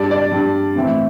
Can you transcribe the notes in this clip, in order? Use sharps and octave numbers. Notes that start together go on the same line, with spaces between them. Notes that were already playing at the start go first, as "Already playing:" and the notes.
Already playing: G2 G3 D4 D5
D5
G2 G3 D4
A2 E3 C4 E4